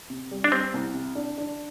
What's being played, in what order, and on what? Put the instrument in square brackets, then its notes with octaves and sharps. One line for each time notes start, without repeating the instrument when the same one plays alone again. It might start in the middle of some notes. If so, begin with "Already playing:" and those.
[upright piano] C3
G3
[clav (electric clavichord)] D4
[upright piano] G3 [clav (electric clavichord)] C4
[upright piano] C2
C3
D4
D4